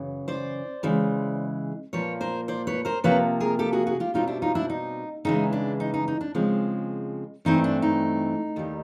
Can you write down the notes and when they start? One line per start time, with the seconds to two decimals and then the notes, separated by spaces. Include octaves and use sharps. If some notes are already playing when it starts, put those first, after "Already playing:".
Already playing: F#2 C#3 E3
0.28 C5 D5
0.83 C#3 E3 G#3
1.93 A#2 F3 A#3 B4 C#5
2.21 A#4 C5
2.48 C5 D5
2.67 B4 C#5
2.85 A#4 C5
3.04 C3 F3 A#3 B4 C#5
3.40 G#4 A#4
3.59 G4 A4
3.73 F#4 G#4
3.87 F#4 G#4
4.00 F4 G4
4.14 B2 G3 C4 D#4 F4
4.27 D4 E4
4.42 D#4 F4
4.55 D4 E4
4.70 D#4
5.25 C#3 E3 G#3 D#4
5.53 D4
5.80 D#4
5.94 D#4
6.08 D#4
6.21 D4
6.35 C#3 F3 G#3 C4
7.45 G2 E3 A3 C4 D#4
7.64 D4
7.82 D#4
8.56 D#2 D#3 G3